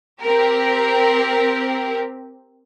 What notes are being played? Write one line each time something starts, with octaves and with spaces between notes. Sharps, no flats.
C4 G4 A#4